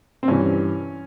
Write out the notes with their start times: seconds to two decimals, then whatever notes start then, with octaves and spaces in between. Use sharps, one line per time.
0.23 C4
0.28 G2 E3 C#4